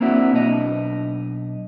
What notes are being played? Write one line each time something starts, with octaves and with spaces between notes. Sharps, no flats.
A#3 C4 D4 E4 F#4
B1 D4 D#5